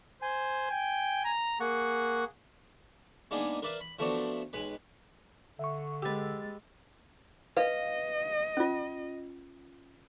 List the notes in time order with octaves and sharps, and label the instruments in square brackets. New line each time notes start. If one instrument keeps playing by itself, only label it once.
[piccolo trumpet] C5 [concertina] G#5
[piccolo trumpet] G5
A#5
[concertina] A#3 F#5 C#6 [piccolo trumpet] G#4
[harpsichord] G#3 A#3 B3 D4 D#4 G#4
A#4 B4 D5 E5 F5
B5
F3 A3 B3 C4 D4 F#4
B1 G#3 B4 B5
[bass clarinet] D3 [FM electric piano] E5 C#6
[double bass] G#3 [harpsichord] G4 B4 [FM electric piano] E6 A6
[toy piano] B4 F5 [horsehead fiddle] D#5
[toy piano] C#4 F4